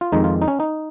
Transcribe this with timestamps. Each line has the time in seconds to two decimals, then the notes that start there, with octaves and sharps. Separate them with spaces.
0.01 F4
0.12 F2 D#3 G#3 D#4
0.24 F4
0.42 D#4
0.48 C#4
0.60 D#4